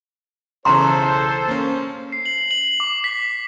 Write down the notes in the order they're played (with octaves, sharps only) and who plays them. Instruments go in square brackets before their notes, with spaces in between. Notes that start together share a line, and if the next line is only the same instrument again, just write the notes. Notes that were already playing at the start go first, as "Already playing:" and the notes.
[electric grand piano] B1 C#3 E3 [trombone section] A4 C5 [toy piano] A#5 C6
[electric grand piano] A#3 C#4
[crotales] C7
F#7
F#7
D6
B6